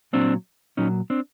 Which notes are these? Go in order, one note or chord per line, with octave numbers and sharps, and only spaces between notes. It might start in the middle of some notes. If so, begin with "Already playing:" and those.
A#2 F#3 C4 D4
A#2 F#3 C#4 D#4
C4 D4